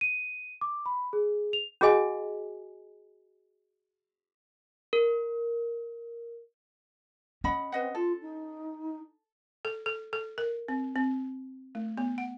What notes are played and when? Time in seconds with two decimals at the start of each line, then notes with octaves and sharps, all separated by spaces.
0.01 D#7
0.61 D6
0.86 B5
1.13 G#4
1.53 F7
1.81 C#4 F#4 G#4 D#5 G#5
4.93 A#4
7.44 C#4 D#5 F#5 B5
7.72 C4 B4 D#5 F#5
7.95 F4 A4
8.21 D#4
9.65 A4
9.86 A4
10.13 A4
10.38 A#4
10.68 C4
10.96 C4
11.75 A3
11.97 B3
12.18 F#5